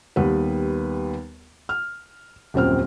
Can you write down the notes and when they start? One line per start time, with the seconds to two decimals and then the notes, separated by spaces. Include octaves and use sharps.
0.16 D#2 G3 B3 B4
1.69 F6
2.54 D#1 F#2 C4 F6